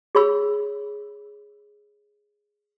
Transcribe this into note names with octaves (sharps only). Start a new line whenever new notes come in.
G#4 C#5 B5 E6